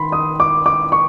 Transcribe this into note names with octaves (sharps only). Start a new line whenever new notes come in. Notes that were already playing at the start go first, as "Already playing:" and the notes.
Already playing: D#3 B5 C6
D#6
D6
D6
C#6